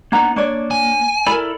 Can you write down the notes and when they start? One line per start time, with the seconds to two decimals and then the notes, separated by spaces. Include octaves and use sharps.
0.12 A#3 B3 D4 D#4 F#5 A#5
0.36 A#3 D4 C#5 D5
0.71 G#5
1.27 E4 A4 A#4 D5 B5